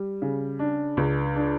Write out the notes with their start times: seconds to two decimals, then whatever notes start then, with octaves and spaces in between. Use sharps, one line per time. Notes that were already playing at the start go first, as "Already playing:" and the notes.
Already playing: G3
0.22 C#3
0.59 D4
0.97 C#2
1.36 D4